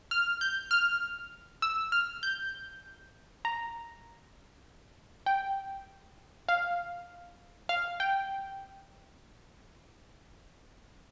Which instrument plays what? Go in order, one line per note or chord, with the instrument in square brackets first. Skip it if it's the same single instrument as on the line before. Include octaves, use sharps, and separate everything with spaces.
[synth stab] F6
G6
F6
E6
F6
G6
A#5
G5
F5
F5
G5